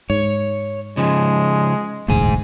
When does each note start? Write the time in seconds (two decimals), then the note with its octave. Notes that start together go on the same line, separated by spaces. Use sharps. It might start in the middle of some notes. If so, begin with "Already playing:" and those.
0.10 G#2 C#5
0.97 C#3 F3 G#3
2.08 E1 A1 D2 G#2 G#4